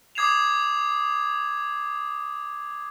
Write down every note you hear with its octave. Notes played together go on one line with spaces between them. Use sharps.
D6 D#6 G#6 C7 E7 F7